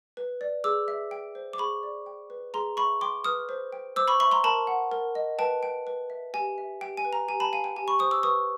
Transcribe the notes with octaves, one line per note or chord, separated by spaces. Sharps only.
B4
D5
G#4 D6 E6
E5
G5
C5
D6
G#4 B5 C#6
D5
G5
B4
G#4 A#5 C6
E5 B5 C#6
G5 C6 D6
B4 D#6 F6
C5
G5
C5 D6 E6
B5 C#6
E5 B5 C#6
A#5 C6
A#4 A5 B5
F#5
A#4
D#5
B4 G5 A5
G5
B4
E5
G4 G#5
E5
G4 G5
G#5
B4
G#5 A#5
G4 G#5 A#5
A5 B5
F5 G#5
G5
G4 G#5
B5 C#6
C5 C#6 D#6
D6 E6
B4 C#6 D#6